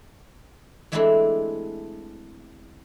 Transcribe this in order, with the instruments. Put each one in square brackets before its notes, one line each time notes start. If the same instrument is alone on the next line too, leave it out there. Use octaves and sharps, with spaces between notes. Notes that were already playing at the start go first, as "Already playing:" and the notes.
[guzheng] E3 G#3 A3 C4 D4 E4